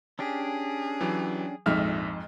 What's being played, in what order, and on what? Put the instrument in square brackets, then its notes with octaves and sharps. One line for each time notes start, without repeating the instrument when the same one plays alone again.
[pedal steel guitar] C#4 D4 G4 [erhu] G#4
[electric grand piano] E3 F#3
[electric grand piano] A#1 E5 F6 [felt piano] F2 G#2